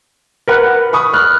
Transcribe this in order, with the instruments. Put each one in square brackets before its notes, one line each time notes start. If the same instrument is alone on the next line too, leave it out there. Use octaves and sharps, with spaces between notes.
[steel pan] A#4 B4 F#5
[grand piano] B5 C#6 D#6
F6 F#6